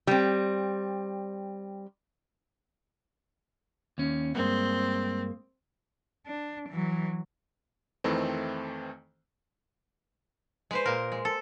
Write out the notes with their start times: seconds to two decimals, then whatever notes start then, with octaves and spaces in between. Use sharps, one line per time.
0.07 G3 C4
3.98 D#2 C#4
4.35 G2 G#3 A#3 C4
6.27 D4
6.69 E3 F#3
8.04 F2 D#3 E3 A3 C4
10.71 G#3 B4 C5
10.86 A#2 A#4
11.12 G#3
11.25 A4